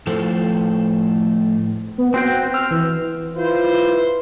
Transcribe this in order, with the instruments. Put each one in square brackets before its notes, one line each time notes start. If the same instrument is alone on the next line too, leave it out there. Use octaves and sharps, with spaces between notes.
[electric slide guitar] A2 F3 A4 C5
[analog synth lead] B3
[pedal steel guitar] C4 F#4 G5 [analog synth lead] C6
[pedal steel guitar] E6 [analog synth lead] F6
[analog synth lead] E3
[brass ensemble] E4 F4 B4 C5